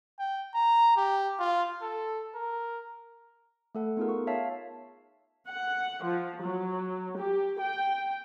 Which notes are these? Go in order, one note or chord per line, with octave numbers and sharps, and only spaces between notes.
G5
A#5
G4
F4
A4
A#4
A3 A4 F#5
B3 D#4 F4 G#4 A#4
C#6
C#5 E5 F5 A5
F#5
F3
F#3
G4
G5